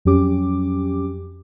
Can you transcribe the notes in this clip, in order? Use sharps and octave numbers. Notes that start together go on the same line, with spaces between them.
F2 F#3 C#4 G4 D6